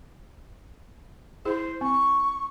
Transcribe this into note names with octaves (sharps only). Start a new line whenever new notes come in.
E4 G#4 C5
C4 C#6